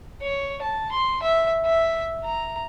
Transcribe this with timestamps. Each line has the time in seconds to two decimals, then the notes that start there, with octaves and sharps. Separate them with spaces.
0.22 C#5
0.62 A5
0.92 C6
1.22 E5
1.66 E5
2.24 A#5